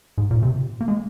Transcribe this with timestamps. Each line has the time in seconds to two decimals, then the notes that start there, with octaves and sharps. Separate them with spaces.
0.18 G#2
0.31 A#2
0.43 C3
0.81 A#3
0.88 G#3